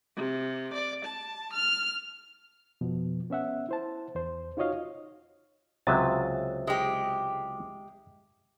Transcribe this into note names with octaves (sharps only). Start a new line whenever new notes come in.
C3
D5
A5
F6
F2 B2 F3 B3
B3 C#4 E5 F#5
E4 C5 A5
E2 C5
D#4 F4 F#4 C#5 D#5 F5
C#2 C3 F#3 E5 D#6 A6
G#3 G4